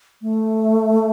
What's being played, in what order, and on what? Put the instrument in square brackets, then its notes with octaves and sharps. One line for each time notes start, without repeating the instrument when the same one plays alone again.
[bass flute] A3